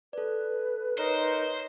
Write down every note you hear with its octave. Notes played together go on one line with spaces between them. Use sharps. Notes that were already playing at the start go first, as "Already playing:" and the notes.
A4 B4 D5
D#4 A#4 C5 C#5